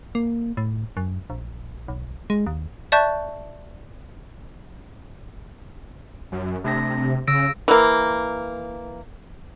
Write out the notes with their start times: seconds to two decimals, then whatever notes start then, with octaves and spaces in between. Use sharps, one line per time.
0.15 A#3
0.57 A2
0.97 F#2
1.30 A#1
1.88 B1
2.30 G#3
2.46 D#2
2.92 D5 E5 A5 C#6 F#6 G6
6.32 F#2
6.64 C3 A3 D4 A#6
7.27 C#3 E6 A#6 D7
7.68 E3 A#3